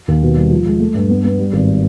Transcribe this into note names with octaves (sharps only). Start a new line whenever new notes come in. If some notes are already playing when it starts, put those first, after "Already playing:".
D#2
B2
G3
F3
G#3
A3
G2
B3
B3
G3
G#1